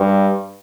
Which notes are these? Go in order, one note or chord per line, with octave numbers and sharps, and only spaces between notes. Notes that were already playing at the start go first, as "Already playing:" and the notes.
Already playing: G2